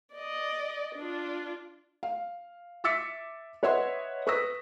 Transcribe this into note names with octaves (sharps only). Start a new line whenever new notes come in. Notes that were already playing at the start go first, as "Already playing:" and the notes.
D5 D#5
D4 F4
F5
E5 D6 E6 A6 B6 C#7
B4 C#5 D#5 E5 F#5 C6
B4 C#6 D#6 E6 A#6 B6